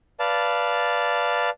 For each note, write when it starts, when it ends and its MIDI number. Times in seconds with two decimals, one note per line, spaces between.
0.20 1.50 71
0.20 1.50 74
0.20 1.50 77
0.20 1.50 81